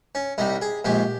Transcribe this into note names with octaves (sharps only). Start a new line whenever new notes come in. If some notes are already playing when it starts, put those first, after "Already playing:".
C#4
C2 C3 G3 D#4
G#4
A#1 G#2 F3 G#3 G4